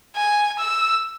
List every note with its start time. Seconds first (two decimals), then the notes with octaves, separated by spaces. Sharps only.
0.16 G#5
0.59 E6